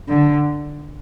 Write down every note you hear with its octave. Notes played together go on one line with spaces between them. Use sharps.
D3